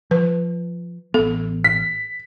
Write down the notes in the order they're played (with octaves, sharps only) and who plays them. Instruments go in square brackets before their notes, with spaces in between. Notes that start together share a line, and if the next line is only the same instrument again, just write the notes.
[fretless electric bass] F3 [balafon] B4
[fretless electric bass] A1 B3 [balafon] A4
[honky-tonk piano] B6